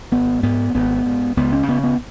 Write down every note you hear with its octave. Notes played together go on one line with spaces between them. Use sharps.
G#1 B3
G#2 B3
G#1 B3
G#2
C#2 B3
C#4
C#3 B3
B3